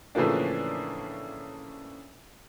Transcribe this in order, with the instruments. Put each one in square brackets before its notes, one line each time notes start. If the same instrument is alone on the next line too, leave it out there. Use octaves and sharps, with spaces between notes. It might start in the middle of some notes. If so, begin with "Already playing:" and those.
[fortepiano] A2 C#3 E3 F3 A#3 D4